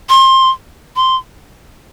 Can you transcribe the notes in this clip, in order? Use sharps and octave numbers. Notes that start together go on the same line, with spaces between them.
C6
C6